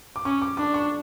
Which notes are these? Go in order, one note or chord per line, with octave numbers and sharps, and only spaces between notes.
D6
C#4 C#6
D6
D4 D6
C#6